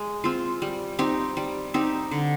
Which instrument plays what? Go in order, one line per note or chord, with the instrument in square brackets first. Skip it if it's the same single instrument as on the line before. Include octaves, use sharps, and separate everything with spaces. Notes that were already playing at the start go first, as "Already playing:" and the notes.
Already playing: [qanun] G#3
C4 F4
G3
C4 D#4 G4
G3
C4 D#4 G4
D3